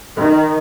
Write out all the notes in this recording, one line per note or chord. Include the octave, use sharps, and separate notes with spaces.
D#3